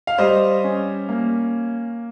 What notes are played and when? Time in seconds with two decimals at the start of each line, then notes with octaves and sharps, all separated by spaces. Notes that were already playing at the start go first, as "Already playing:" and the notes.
0.07 F5
0.18 G3 C5 D#5
0.64 C#4
1.09 A#3